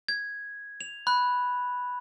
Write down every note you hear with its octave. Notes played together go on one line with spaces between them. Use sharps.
G#6
F7
B5 F#6